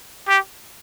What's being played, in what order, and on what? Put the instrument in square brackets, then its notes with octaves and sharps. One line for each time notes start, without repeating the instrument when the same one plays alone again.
[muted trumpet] G4